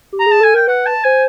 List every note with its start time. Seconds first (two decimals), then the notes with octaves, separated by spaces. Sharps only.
0.13 G4
0.20 A#5
0.26 G#4 A5
0.41 A4 G#5
0.54 A#4 G5
0.67 B4 F#5
0.86 A5
1.04 C5 G#5